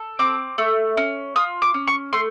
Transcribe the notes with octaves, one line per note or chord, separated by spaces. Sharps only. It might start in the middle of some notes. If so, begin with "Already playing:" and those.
Already playing: A4
C4 D6
A3
C#4
F4 D#6
D6
C#4
C#6
A3 C6